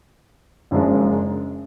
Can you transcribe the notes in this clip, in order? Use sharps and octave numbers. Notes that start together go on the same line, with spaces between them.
F#1 F#2 F3 G#3 D4